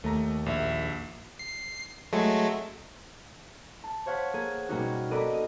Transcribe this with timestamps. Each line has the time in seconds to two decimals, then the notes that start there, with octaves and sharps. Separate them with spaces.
0.04 D#2 A3 A#5
0.46 A#1 E5
1.39 C7
2.13 F#3 G#3 A3
3.84 A5
4.06 C5 C#5 F5 F#5 B6
4.34 A#3 G#4
4.69 B2 G3 A#3 C#4 D#4 F#4
5.11 A#3 D#4 A4 B4 D5 D#5
5.34 D#5